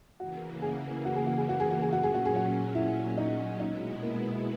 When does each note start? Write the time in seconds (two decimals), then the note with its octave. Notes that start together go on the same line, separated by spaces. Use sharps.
0.20 C#3 E3 A#3 F#4
0.62 G#4
1.05 F#4
1.16 G#4
1.27 F#4
1.38 G#4
1.49 F#4
1.60 G#4
1.71 F#4
1.82 G#4
1.90 A#2 F#3 C#4 F#4
2.03 G#4
2.14 F#4
2.25 G#4
2.36 F#4
2.75 E4
3.18 D#4
3.60 B2 G#3 B3 D#4 E4
4.03 A#3